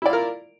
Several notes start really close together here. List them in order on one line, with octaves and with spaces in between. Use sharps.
E4 D5 F4 A#4